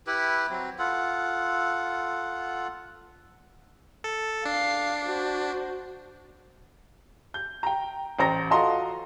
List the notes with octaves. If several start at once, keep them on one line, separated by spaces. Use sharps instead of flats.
E4 G4 B4
F#3 C4
F4 A4 F#5
A4
D4 F5 C7
F#4 C5
G6
G5 A#5
A1 C5 A#5 A#6
F4 F#4 A4 D#5 A#5 C6